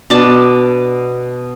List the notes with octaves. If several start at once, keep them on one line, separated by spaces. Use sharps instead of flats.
B2 D4 A5